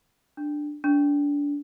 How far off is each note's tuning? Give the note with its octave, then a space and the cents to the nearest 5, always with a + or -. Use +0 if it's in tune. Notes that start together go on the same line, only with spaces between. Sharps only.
D4 +10
D4 -30